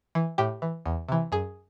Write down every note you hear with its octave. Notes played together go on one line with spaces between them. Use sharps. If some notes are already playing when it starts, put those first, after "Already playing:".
E3
A2 G4
E3
E2
C3 E3
F#2 G#4